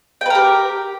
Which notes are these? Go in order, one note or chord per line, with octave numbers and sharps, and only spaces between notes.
G4 A#4 B4 G5